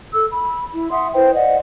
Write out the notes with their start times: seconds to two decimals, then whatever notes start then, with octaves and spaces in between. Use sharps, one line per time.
0.14 A4 E6
0.32 B5
0.73 E4
0.91 E5 F#5 C6 D#6
1.14 E4 B4 C5 G5
1.35 D5 D#5 F#5